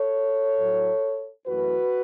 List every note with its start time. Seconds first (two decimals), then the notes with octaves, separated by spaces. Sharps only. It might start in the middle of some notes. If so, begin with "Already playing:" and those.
Already playing: A4 C#5
0.60 A2 F#3 A3
1.46 F#2 E3 A3 F#4 B4